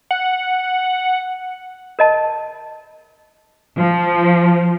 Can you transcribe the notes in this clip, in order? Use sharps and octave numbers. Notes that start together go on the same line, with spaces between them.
F#5
A#4 D#5 A5
F3